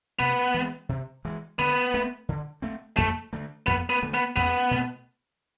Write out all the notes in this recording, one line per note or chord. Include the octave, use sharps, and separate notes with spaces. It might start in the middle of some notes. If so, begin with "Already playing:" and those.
C3 B3
E3 G#3
C3
E3 G#3
D3 B3
A3 C4
D3
A3 C4
F2 A3
D3 A3
F2 B3
B3
D3 A3
B3
E2 B3
B2 A3